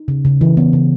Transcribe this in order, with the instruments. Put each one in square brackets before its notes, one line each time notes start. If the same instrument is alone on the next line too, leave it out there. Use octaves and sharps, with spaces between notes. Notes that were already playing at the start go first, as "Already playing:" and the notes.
Already playing: [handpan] D#4
C#3
C#3
E3
B3
C#3